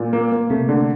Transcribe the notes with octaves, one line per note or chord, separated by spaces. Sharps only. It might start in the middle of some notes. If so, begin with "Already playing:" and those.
Already playing: A#2
A#3
A#3
C3 A3
D3